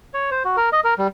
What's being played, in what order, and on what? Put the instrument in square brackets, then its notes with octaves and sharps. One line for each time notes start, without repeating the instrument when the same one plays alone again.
[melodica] C#5
C5
F#4
A#4
D#5
A#4
G3